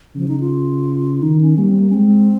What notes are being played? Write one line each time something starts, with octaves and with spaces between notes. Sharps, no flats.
C#3 F3
D#4
F4
D#3 D#4
C#4
G3 A#3
C4
A#3
C#4
G#3 C4